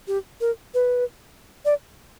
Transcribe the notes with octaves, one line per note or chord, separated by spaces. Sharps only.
G4
A#4
B4
D5